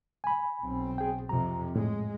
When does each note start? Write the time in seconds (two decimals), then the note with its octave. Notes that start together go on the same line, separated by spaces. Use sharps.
0.24 G#5 B5
0.61 B1 C4
0.98 G#4 G5
1.29 F2 C3 A#5
1.76 A2 G#3